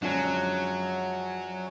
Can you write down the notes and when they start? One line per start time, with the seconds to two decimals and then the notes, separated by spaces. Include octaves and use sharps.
0.02 F#2 D3 F3 F#3 G#3 C#4